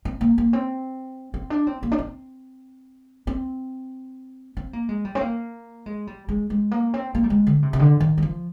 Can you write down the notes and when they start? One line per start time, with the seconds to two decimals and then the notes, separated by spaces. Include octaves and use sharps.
0.05 C4
0.21 A#3
0.38 A#3
0.53 C4
1.34 C4
1.50 D4
1.67 C4
1.83 A#3
1.92 D4
1.98 C4
3.27 C4
4.57 C4
4.73 A#3
4.89 G#3
5.05 G3
5.15 C4
5.21 A#3
5.86 G#3
6.07 G3
6.29 G#3
6.50 G#3
6.71 A#3
6.94 C4
7.15 A#3
7.24 G3
7.30 G#3
7.47 D3
7.63 C3
7.73 C3
7.79 D3
8.00 D#3
8.18 G3
8.22 F3